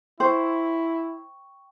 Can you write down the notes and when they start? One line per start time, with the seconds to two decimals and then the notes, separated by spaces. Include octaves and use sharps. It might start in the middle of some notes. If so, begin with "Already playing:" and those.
0.20 E4 C5 G5 C#6